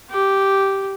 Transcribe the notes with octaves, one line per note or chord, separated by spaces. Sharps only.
G4